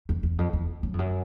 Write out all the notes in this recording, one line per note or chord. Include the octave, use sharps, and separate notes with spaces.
E2
E2
F2
E2
F#2
F2
F#2